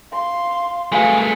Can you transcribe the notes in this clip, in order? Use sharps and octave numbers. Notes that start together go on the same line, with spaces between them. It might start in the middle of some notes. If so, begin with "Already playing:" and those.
F5 C6
G#3 A3 F#4 G#4 B4 F5 G#5